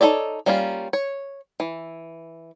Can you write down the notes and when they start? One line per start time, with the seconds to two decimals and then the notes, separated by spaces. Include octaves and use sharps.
0.01 D#4 F4 A4 C#5 D5
0.46 G3 A#3 C#4 D#4 F4
0.93 C#5
1.60 E3